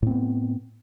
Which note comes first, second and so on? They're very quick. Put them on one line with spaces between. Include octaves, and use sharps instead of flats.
A2 C4 B3